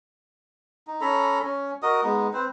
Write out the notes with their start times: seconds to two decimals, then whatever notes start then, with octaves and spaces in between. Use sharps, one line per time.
0.87 D#4
1.01 C#4 A4 A#5 B5
1.43 C#4
1.83 F#4 A#4 D#5 D#6
2.03 G#3 B3 D#4
2.33 C4 B4 C5